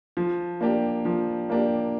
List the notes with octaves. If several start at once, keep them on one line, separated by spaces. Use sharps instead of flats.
F3
A#3 D4 G4
F3
A#3 D4 G4